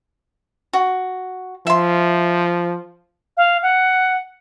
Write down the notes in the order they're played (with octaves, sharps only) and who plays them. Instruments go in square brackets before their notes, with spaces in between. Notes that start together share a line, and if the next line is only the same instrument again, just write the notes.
[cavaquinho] F#4
[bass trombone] F3 [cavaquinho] E5 C6
[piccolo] F5
F#5